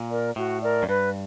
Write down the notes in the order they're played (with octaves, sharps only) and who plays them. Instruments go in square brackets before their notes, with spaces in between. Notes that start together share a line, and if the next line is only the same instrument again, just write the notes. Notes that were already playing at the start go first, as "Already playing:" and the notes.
Already playing: [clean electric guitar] A#2
[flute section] A#4 D5
[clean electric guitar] A2 [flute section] F#4
[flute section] A#4 D5
[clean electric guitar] F#2
[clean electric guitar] G2 [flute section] B4